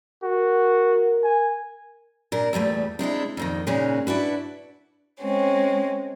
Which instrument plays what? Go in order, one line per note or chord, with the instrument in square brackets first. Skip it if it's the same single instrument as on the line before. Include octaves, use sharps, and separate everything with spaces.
[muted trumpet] F#4 [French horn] A#4
[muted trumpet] G#5
[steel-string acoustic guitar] A#2 D4 A#4
E2 A#2 G3 A3
C3 G#3 D4 E4
F2 A#2 D#3
A#2 C#3 G#3 C#4 D#4 F#4
D4 E4 F#4 B4
[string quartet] G#3 C4 C#4